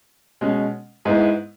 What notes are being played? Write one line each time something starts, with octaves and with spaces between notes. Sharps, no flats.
B2 G#3 C#4
G#2 G#3 B3 E4